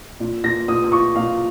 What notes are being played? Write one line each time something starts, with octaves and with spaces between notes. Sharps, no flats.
A#2
A#2 A#6
A#2 D#6
D#6
F4 C#6
A#2 F5